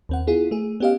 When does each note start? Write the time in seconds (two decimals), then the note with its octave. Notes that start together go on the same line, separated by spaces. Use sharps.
0.09 D#2 C4 F#5
0.27 B3 E4 F4 G#4
0.51 A3 G#4
0.80 B3 C#4 G4 D#5 F5